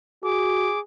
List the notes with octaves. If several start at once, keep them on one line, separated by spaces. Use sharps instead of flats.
F#4 G#4 D6